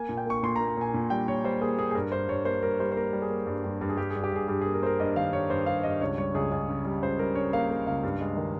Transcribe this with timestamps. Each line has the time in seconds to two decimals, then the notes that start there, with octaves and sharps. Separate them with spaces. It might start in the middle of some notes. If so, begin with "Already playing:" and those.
Already playing: A#3 G#5
0.09 A#2
0.17 G5
0.26 A#3 C#6
0.43 A#2 C6
0.56 A#5
0.61 A#3
0.68 A#5
0.77 A#2 G#5
0.94 A#2
1.10 G3 G5
1.28 A#2 C#5
1.44 G3 C5
1.61 A#3 G#4
1.78 A#3 G#4
1.91 G#4
1.95 G2 A#4
2.12 G2 C5
2.28 G2 C#5
2.45 A#3 C5
2.63 G2 A#4
2.80 G3 C5
2.92 C5
2.97 A#3 A#4
3.13 G3
3.22 G#4
3.30 A#3
3.47 G2
3.64 G2
3.81 G2
3.89 G#4
3.97 G2 G4
4.10 G2 G#4
4.24 G4
4.32 G2 G#4
4.48 G2 G4
4.61 A#3 G#4
4.74 A#4
4.82 A#3 C5
4.86 A#4
5.00 G2 D#5
5.16 D#3 F5
5.33 G2 C#5
5.50 G2 C5
5.66 G2 F5
5.83 G2 D#5
6.01 C#2 C#5
6.17 G3 C#5
6.34 C#2 G#4
6.51 C#2 G#4
6.69 C#3
6.85 G3
7.03 C#2 C5
7.19 G3 A#4
7.35 C#3 C#5
7.53 A#3 F5
7.70 A#3
7.86 C#2 F5
8.04 G2
8.21 G#3
8.37 D#3